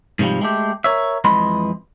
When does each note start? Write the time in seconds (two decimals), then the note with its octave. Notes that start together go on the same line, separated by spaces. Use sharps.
0.19 G#2 C3 D#3 F3 G3
0.41 G#3 A3 G4
0.84 A#4 C#5 E5
1.24 F2 E3 G#3 D#5 B5 C6